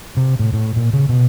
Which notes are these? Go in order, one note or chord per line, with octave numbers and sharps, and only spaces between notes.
C3
A2
A2
A#2
C#3
B2